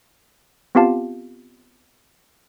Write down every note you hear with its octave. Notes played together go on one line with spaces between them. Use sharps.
B3 C4 F4 G4 F5 A5